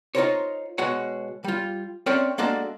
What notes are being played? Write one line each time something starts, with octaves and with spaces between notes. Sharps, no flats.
D#4 F4 G#4 A#4 C5 C#5
B2 G#3 F#4 C#5 F#5
G3 F4
C4 C#4 A#4 C#5 D5 E5
G#3 A#3 D4 F#4 A4